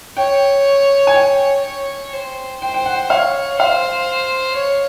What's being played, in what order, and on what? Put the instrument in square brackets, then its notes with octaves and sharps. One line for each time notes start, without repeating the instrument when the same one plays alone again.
[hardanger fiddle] C#5 [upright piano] G5
[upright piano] G#5
G5
[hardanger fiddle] C#5
C5
[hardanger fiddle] C5 [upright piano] G5
[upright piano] G5
F#5
[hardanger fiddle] C#5 [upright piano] F5
[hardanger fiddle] C5 [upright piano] F5
[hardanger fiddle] C#5